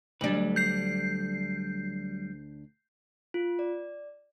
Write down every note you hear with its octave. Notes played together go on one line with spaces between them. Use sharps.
D2 F#3 G3 D4 B4
G6 C7
F4
D5